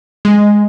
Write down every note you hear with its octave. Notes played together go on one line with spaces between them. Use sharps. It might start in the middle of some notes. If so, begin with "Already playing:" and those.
G#3